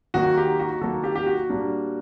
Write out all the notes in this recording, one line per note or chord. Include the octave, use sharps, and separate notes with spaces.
D#3 F#3 A#3 D#4 F#4
G4
F#4
D#3 F#3 A#3 D#4 F#4 A4
G4
G4
F#4
A#2 G3 A#3 D4